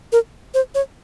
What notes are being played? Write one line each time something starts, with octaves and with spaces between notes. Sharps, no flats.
A#4
C5
C#5